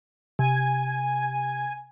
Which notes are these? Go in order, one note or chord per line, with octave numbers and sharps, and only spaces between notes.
C3 G#5